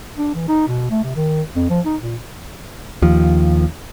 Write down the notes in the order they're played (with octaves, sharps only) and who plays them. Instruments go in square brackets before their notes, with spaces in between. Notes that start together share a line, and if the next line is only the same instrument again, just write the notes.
[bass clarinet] D4
E3
D#4
B2
A3
C3
D#3
F2
F3
D#4
A#2
[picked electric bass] D#2 F3